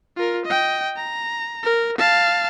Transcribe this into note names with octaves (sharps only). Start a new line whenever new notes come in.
F4 A#4
D#5 G5
A#5
A#4
F5 A5